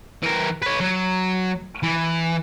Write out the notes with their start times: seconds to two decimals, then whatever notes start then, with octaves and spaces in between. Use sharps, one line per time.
0.23 E3 A#4
0.62 B4 C#5
0.80 F#3
1.83 E3